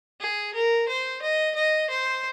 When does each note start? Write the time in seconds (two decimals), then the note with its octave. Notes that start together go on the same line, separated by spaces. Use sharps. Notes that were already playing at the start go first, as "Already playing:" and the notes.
0.20 G#4
0.54 A#4
0.88 C5
1.22 D#5
1.55 D#5
1.90 C5